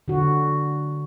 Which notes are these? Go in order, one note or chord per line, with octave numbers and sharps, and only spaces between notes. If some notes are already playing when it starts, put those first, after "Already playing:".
D3 F#4